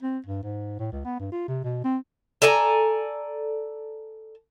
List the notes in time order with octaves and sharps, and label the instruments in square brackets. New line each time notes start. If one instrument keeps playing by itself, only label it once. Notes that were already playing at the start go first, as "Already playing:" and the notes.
[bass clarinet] C4
G2
G#2
A2
C#2
B3
G2
F4
C3
B2
C4
[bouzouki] A4 D5 G#5 A#5